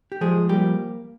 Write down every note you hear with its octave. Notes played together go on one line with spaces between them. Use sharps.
G4
F3 G#3 G#4
G3 A#3 G4